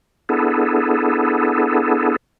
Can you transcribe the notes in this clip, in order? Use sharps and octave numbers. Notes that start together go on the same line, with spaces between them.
B3 D4 E4 G#4 A4